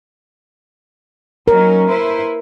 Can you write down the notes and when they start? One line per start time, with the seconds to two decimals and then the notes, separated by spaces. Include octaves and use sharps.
1.48 F#3 C#4 D#4 A#4
1.88 E4 B4 C5